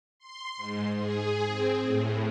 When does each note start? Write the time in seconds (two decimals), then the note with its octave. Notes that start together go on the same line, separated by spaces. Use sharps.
0.19 C6
0.57 G#2
0.97 G#4
1.47 C4
1.80 A2